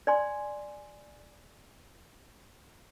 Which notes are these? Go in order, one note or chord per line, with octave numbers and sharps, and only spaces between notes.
D5 G#5 C6